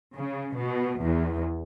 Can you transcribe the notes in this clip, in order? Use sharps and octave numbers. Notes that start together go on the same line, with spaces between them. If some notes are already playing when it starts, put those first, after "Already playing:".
C#3
B2
E2